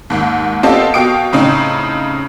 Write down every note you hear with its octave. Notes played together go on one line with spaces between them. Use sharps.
D#2 G#2
B3 C4 F4 G4 A4 D#5
B2 F5 G5 D#6 D7
A2 C#3 C4 D#4